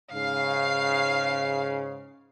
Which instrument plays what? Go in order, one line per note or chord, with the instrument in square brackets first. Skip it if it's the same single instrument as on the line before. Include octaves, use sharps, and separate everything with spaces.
[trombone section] G#2 C#3 [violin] F5 C7